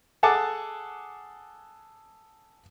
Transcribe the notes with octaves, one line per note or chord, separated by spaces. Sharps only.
G#4 A4 F#5 G#5 A5 D6